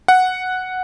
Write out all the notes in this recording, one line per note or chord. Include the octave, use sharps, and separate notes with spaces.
F#5